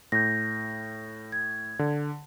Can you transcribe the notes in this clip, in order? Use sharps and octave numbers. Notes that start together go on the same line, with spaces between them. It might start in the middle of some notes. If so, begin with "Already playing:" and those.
A2 G6 A#6
G#6
D3